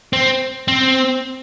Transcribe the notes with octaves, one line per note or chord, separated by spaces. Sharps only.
C4
C4